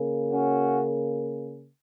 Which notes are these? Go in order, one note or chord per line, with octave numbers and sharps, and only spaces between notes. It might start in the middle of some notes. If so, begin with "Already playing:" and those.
Already playing: C#3 A#3
C#4 F#4